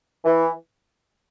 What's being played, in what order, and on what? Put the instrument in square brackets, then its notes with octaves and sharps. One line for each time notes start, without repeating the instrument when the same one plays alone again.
[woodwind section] E3